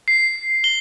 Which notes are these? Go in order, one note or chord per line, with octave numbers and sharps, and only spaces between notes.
C7
G7